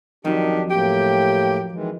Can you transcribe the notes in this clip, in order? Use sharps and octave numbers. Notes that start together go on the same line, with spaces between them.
F2 D#3 F#3 D4 G4
A2 A#3 G4 G5
D#3 E3 G#3